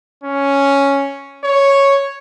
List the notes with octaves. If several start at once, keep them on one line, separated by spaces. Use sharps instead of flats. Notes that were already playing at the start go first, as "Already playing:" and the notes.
C#4
C#5